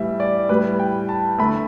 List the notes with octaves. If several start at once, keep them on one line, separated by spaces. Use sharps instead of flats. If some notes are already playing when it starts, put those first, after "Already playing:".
Already playing: A2 E3 G3 E5
D5
A2 G3 B4
G5
A5
D3 A3 B5